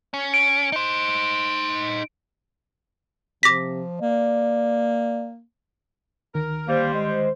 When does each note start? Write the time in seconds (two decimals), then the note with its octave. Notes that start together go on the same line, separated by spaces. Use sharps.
0.14 C#4
0.34 D7
0.72 D#4 C5
3.43 C3 F3 D6 A#6 B6
4.01 A#3 D5
6.34 D2 D#3 A#4
6.68 G3 A#3 C5
6.94 G#3